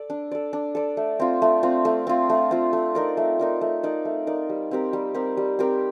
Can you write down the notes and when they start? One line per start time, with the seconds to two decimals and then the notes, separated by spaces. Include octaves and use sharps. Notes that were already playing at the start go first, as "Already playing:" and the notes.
Already playing: A4 D5
0.10 D4
0.31 A4 D5
0.53 D4
0.75 A4 D5
0.97 A3
1.19 C4 F4
1.42 A3
1.63 C4 F4
1.85 A3
2.07 C4 F4
2.29 A3
2.51 C4 F4
2.73 A3
2.95 D#4 A#4 D5
3.17 A3
3.39 D#4 A#4 D5
3.61 A3
3.83 D#4 A#4 D5
4.05 A3
4.27 D#4 A#4 D5
4.49 G3
4.71 C4 G4 A#4
4.93 G3
5.14 C4 G4 A#4
5.37 G3
5.59 C4 G4 A#4